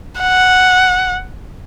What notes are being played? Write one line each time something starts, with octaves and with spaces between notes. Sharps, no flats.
F#5